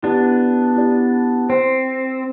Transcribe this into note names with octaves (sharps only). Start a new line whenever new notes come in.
B3 D4 E4 G4 D5
E4 G4 D5
C4 C5 G5 C6